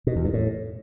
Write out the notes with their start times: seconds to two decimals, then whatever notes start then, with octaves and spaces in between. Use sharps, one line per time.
0.07 B2
0.16 E2
0.25 G2
0.34 A2